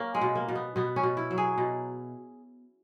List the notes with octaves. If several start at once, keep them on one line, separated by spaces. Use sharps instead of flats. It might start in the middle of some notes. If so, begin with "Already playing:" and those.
Already playing: A#3 C#4
G#3
B2
A#3
B2
B3
B2 B3
C#4
B2
E4
F#3
G#4
B2